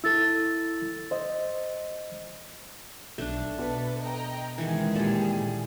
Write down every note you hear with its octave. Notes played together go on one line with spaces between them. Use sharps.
E4 A4 E6 A6
C5 D#5
B1 A3 D4
B2 B3 A4 B4
D#5 G5 A#5
C#2 D#3 E3 G#4
A#2 G3 A4